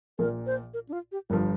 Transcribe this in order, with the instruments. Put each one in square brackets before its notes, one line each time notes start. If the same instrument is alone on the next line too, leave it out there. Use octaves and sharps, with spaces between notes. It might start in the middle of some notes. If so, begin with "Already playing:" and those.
[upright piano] A#1 A#2 A#3 [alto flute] A#4
[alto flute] C5
A#4
D4
F4
G4
[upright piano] G1 G2 F3 [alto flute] A#4